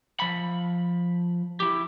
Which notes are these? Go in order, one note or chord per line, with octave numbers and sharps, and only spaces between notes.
F3 B5
E4 G4